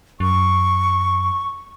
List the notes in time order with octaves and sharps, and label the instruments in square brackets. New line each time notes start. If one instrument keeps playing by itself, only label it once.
[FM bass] F#2 [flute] C#6